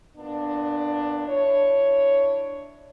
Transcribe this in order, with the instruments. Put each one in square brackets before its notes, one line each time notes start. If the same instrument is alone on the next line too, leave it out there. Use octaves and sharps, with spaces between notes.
[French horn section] A#2 B3 D4
D4 E4 C#5